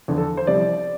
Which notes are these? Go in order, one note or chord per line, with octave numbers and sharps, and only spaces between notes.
E2 D3 F3
A4
C5
C2 C3 F3 D5